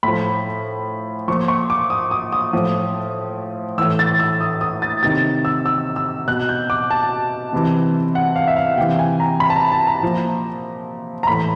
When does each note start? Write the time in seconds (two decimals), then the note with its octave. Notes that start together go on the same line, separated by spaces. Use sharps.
0.03 A2 F3 B5
1.28 A#2 F3 C#6
1.48 C#6
1.70 D6
1.90 D#6
2.11 D#6
2.33 D#6
2.53 A2 F3
3.78 A2 E3 E6
3.99 A6
4.19 E6
4.41 D#6
4.61 D#6
4.82 A6
5.03 C3 D#3 A6
5.45 E6
5.66 E6
5.96 E6
6.28 B2 F#6
6.49 G6
6.70 D6
6.91 A5
7.53 C3 E3
8.15 F#5
8.36 F5
8.47 E5
8.56 F5
8.78 C3 E3 G5
8.99 G#5
9.20 A#5
9.40 B5
9.50 A5
9.56 A#5
9.72 A5
9.87 A#5
10.02 A#2 F3
11.23 A#5
11.27 A2 E3 B5